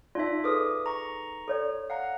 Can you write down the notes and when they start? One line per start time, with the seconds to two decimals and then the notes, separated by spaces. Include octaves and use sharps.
0.15 D#4 F4 D5 E5
0.44 G#4 A4 B4 D6 D#6
0.86 A#5 C#6
1.48 A4 C#5 D5
1.90 F5 F#5 A#5